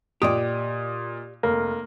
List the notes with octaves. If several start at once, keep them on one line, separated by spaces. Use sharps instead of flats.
A#2 G4 D5 D#5 D#6
F1 A#3